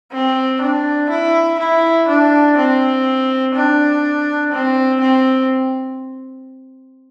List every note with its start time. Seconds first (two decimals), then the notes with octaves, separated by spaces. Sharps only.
0.12 C4
0.61 D4
1.10 E4
1.59 E4
2.09 D4
2.57 C4
3.55 D4
4.52 C4
5.01 C4